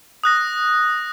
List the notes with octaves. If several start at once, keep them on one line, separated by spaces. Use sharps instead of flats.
D#6 F#6 A#6